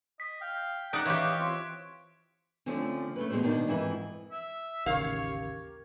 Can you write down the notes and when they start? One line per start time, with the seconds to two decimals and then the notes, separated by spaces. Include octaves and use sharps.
0.20 D#5 B6
0.41 F5 G5
0.93 D#4 D5 F#5 D6 F#6 D7
1.05 E3 G4 C#5 D#5 F5
1.39 C4 F4 C#5
2.66 D3 F3 A3 C4 C#4
3.16 A3 C#4 B4
3.30 E2 B2 G3 G#3 F#4 C5
3.43 B2 D#3 D4
3.67 F2 G#2 E3 D#4 E4
4.31 E5
4.86 A1 D#2 C#3 G4 A#4 C#5 F5